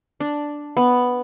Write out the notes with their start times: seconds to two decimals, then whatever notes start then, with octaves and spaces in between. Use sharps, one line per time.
0.20 D4
0.77 B3